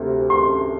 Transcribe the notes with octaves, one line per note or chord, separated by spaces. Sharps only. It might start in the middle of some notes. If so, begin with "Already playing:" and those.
Already playing: D2 C3
C6